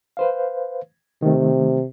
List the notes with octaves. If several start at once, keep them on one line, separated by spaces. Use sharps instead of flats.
B4 C5 F5
C3 D#3 A3